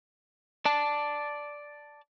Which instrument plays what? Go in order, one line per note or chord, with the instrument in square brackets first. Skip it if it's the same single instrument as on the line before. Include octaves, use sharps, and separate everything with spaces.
[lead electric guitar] D5 A5